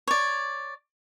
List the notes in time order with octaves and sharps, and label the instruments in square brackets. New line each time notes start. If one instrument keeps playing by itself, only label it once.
[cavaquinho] C#5 D5